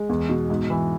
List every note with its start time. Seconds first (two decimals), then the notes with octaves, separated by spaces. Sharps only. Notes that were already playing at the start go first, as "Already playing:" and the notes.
Already playing: G#3
0.09 E2
0.29 B2
0.50 G#2
0.70 E3